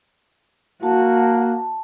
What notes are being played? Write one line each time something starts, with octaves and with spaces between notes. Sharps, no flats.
A#3 F#4 A5